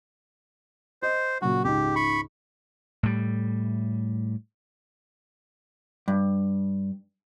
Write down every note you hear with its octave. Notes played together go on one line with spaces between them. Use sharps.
C5 D#5
A#2 C#3 F#3 F#4
C#2 G#2 G4
B5 C#6
A2 G3
G2